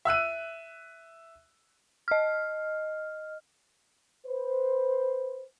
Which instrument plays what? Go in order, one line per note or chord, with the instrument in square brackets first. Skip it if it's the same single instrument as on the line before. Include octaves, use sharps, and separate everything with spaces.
[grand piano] E5 E6 F#6 D#7
[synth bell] D#5 F6
[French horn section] B4 C5